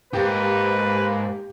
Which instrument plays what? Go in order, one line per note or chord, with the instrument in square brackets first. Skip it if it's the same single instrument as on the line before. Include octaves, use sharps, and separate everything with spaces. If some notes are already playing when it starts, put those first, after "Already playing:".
[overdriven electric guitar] G#2 [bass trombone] A#3 [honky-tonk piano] G4 [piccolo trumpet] B4